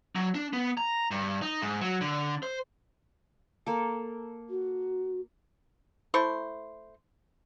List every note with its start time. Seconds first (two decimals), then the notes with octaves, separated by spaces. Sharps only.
0.15 F#3
0.35 D4
0.53 B3
0.78 A#5
1.11 G2
1.42 D#4
1.62 G#2
1.81 F#3
2.01 D3
2.43 C5
3.66 A#3 A4
4.50 F#4
6.14 A3 E4 C5 C#6